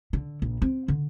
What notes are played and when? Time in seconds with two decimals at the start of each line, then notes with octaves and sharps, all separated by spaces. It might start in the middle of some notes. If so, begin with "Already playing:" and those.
0.13 D3
0.42 A#1
0.62 C4
0.88 D3